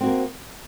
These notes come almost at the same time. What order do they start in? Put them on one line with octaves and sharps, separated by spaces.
C4 F#4 A#3